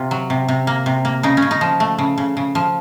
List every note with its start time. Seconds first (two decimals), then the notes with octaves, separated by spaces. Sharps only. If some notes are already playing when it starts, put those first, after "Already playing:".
Already playing: C3 F4
0.11 F#3
0.30 C3
0.48 C3
0.67 A#3
0.86 C3
1.05 A#3
1.23 C#3 D#4
1.37 C#4
1.42 C#3
1.51 D#4
1.61 F3
1.80 A3
1.98 C#3
2.18 C#3
2.37 C#3
2.55 F3